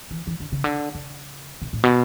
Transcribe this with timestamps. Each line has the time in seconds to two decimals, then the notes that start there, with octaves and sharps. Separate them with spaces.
0.11 E3
0.27 E3
0.40 D3
0.52 C#3
0.64 D3
0.95 C#3
1.62 B2
1.73 A2
1.84 B2